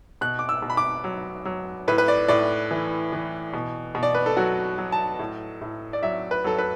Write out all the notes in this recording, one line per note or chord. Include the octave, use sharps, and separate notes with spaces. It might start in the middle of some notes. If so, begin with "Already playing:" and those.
B2 F#6
D6
E6
B2
B5
D6
F#3
F#3
A2 B4
B4
D5
A2 D5
E3
E3
B2
B2
D5
B4
A4
F#3 F#4
F#3
A5
A2
A2
D5
F#3 E5
B4
F#3 A4
B4